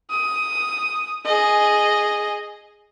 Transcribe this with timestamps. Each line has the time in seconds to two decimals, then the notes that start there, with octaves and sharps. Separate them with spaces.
0.11 D#6
1.25 G#4 D#5